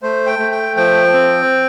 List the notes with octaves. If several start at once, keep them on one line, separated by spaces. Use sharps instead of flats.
A3 C5
G5
A3
G5
F3 G5
C4